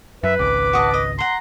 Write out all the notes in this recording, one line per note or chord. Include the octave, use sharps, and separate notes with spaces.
F#2 B4 E5
G#1 C#2 D6
F#4 D#5 A5
D#5
F#5 A#5 C6